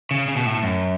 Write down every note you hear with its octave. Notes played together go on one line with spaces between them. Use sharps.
C#3
C#3
B2
A2
F#2